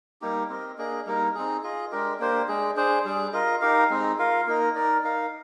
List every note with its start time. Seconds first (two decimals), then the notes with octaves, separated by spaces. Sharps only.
0.21 G3 A#3 D#4 G4
0.49 C4 G4 A#4 D#5
0.77 A#3 D4 G#4 D#5
1.06 G3 A#3 D#4 A#4
1.35 C4 D#4 G#4
1.63 F4 G#4 D#5
1.91 G#3 D4 G4 A#4
2.19 A#3 D4 G4 C5
2.48 G#3 D4 G#4
2.76 D4 G#4 C5
3.05 G3 D4 G#4
3.33 F4 A#4 D#5
3.61 D#4 G4 A#4 F5
3.90 G#3 C4 D#4
4.18 F4 A#4 F5
4.46 A#3 D#4 A#4 D#5
4.75 D#4 A#4 D5
5.04 D#4 A#4 F5